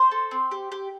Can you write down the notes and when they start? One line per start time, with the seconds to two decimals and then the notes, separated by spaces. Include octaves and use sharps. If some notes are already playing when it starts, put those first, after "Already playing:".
Already playing: C5 C6
0.11 A4
0.31 C4
0.51 G4
0.72 G4